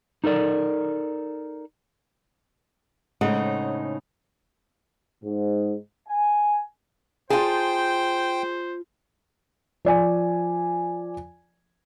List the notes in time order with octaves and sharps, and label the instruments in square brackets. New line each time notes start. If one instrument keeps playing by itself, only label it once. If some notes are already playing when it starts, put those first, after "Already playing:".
[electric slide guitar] D#4 A4 A#4 D5
[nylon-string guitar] A2 C#3 G#3 C4 D#4 F#5
[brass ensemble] G#2
G#5
[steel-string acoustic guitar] F4 A5 [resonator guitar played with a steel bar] G#4 [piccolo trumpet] C5 [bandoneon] G5
[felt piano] F3 D5 G#5